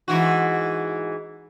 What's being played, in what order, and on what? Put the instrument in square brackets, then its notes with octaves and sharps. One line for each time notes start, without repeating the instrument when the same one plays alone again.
[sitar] G#2 E3 F#4